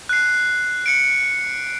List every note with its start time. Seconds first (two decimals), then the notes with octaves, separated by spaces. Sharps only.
0.09 F#6 C7
0.86 C#7 D7